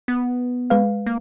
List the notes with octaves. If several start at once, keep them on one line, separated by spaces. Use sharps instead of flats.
B3
G#3 B4 F5
A#3